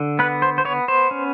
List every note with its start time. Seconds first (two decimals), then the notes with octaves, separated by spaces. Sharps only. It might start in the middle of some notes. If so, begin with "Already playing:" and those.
Already playing: D3
0.19 B3 B4
0.42 C5
0.58 C5
0.65 B3 C#5
0.88 C5
1.11 C#4